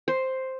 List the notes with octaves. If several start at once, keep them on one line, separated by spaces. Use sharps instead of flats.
C5